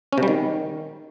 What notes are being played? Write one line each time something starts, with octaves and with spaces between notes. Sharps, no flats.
C#4
C3
G3
D#3